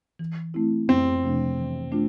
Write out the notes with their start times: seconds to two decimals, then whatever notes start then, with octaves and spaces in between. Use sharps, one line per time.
0.19 E3
0.54 A3 C4 E4
0.88 F2 C4
1.24 C3 F3 A3 D4
1.58 E3
1.92 A3 D4 F4